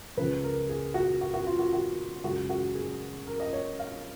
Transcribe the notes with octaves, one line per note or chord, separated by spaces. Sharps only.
C#2 C#3 F3 B4
A#4
G#4
F#4
F#4
F#4
F4
F#4
F#4
F#2 C#3 G#3 F#4
F#4
G#4
A#4
D#5
C#5
F5